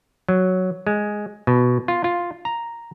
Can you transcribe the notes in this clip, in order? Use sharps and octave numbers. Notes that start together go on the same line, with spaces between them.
F#3
G#3
B2
F4
F4
A#5